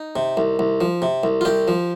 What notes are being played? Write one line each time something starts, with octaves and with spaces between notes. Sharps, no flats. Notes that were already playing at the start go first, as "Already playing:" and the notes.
Already playing: D#4
C3
C2
C2
F3
C3
C2
F4
C2 G4
F3